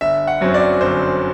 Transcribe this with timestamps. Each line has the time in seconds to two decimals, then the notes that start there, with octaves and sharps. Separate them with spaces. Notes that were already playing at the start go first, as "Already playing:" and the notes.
0.01 G1 E5
0.27 F#5
0.41 F#2 F#3 C4
0.54 D5
0.81 G1 C5